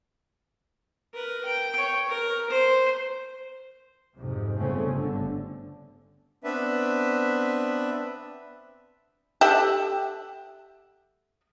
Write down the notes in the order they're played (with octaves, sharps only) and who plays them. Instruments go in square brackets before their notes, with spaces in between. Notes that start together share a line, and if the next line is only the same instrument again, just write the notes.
[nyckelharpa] A#4 B4
G5
C#5
A#4
C5
[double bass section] F2 G#2 C3
G1 C#3 A3 C4 C#4
G1 D3
[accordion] B3 C4 D4 B4 E5
[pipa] G4 A4 E5 F#5